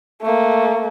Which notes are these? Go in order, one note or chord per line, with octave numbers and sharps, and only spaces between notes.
A3 A#3